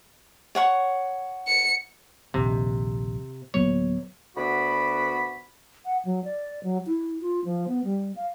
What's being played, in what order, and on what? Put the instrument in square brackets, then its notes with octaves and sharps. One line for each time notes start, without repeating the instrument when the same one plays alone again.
[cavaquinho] C#5 F#5 C#6
[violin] C#7
[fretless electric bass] A#1 D#2 [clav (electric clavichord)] C3
[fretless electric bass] D1 G#1 A#3 [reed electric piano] F#3 B3 [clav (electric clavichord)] C#5
[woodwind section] D2 B3 F#4 D5 B5
[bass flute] F#5
F#3
D5
F#3
E4
F4
F3
B3
G3
F5